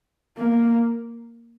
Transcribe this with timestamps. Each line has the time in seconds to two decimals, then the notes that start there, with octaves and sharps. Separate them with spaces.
0.37 A#3